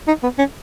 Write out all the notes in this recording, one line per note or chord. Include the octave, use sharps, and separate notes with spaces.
D#4
B3
C#4